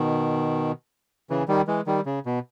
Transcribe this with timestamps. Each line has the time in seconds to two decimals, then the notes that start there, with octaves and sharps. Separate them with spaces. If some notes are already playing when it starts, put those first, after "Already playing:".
Already playing: B2 D#3
1.30 C#3 E3
1.48 D#3 G3
1.67 E3 G#3
1.87 D#3 G3
2.06 C#3
2.26 B2